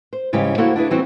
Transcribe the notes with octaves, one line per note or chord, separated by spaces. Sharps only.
C5
G#2 C#3 E3 G3 C#4 G4
A#3 E4 F#4 A4 C5 F#5
D4 E4 G#4 B4
E3 G3 B3 C4 E4 F#4